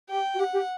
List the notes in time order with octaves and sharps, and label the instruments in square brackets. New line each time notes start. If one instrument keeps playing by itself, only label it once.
[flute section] G4 [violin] G5
[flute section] F#4
[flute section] G4 [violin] F#5
[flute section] G4